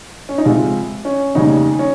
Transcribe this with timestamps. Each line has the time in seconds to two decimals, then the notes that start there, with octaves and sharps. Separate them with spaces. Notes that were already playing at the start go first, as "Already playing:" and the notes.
0.29 C#4
0.38 D#4
0.45 C#2 C3 F3 G#3 F4
1.05 C#4
1.35 F1 D#2 C#3 G3 D#4
1.79 C#4